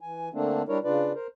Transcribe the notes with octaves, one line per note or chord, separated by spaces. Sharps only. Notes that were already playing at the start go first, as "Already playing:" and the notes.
E3 G#5
D3 A3 A#3 C4 D4
G3 D4 E4 A#4 C#5
C#3 D4 F4 B4 D5
A#4 C5